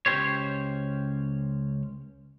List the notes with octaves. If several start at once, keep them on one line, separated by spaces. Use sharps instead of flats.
C#2 C#4 G4 C5 C#5